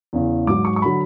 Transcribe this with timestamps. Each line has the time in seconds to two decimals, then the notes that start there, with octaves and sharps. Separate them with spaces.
0.13 E2 C#3 E3
0.47 G#2 F#3 D6
0.65 C#6
0.76 C#6
0.82 D3 F#3 B5